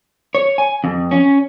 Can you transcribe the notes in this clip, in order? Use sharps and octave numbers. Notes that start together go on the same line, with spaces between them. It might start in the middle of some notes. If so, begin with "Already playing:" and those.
C#5
G#5
F2
C#4